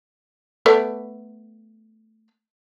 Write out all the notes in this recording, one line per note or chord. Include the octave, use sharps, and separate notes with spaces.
A3 B3 D5